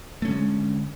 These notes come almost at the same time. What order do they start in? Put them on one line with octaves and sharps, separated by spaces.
A3 C#4 D3 G#3